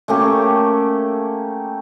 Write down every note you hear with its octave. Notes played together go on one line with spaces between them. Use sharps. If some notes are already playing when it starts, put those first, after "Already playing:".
A3 A#3 C#4 G4